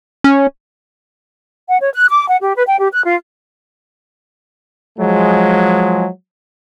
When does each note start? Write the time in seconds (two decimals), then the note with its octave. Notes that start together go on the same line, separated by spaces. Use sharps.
0.24 C#4
1.68 F#5
1.81 C#5
1.94 F#6
2.09 D6
2.29 F#5
2.42 G4
2.56 B4
2.68 G5
2.79 G4
2.93 F#6
3.05 F4
4.99 F3 F#3 G#3